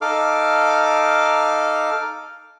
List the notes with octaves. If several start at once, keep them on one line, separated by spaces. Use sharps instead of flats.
D#4 A4 F5 D6 F6